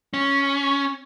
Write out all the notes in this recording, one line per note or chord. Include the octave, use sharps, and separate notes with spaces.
C#4